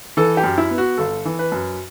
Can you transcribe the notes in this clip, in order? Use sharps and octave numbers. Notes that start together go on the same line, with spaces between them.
E3 A4
G4
F#2
E4
B3
F#4
G1 A4
E3
B4
F#2